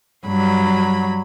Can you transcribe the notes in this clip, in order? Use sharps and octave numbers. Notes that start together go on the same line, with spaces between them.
G2 F#3 B5